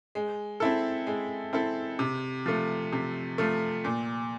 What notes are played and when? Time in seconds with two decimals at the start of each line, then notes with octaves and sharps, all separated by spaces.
0.15 G#3
0.60 C4 E4 A4
1.07 G#3
1.53 C4 E4 A4
1.99 C3
2.46 F3 A3
2.92 C3
3.38 F3 A3
3.85 A#2